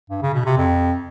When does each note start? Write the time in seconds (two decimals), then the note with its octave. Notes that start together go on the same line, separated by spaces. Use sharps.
0.10 G2
0.22 C#3
0.34 B2
0.46 C3
0.58 F2